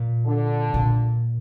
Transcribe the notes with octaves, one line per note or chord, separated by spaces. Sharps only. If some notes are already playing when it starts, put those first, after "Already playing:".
Already playing: A#2
D3
A#2